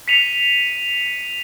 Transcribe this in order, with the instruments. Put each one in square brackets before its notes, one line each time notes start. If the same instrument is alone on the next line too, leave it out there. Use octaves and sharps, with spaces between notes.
[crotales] B6 C#7 D#7 F7